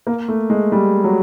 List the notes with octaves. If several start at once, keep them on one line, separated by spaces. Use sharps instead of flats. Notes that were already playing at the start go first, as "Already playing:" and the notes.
A#3
A3
G#3
G3
F#3